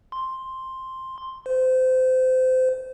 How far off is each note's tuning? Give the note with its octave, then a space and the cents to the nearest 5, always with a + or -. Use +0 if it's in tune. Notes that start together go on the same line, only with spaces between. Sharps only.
C6 +5
C5 -25